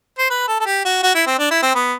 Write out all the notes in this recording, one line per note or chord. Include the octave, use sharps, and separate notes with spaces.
C5
B4
A4
A4
G4
F#4
F#4
E4
C4
D4
E4
C4
B3